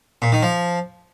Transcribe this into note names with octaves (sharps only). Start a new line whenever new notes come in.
A#2
D#3
F3